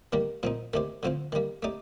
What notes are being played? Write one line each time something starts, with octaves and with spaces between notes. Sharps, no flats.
D#3 G3 A#3 D4
A#2 F3 C4 D#4
D#3 A3 D4 G4 C5
D3 F3 C4 F4 C5
D#3 G3 A#3
A3 D#4 G4 D5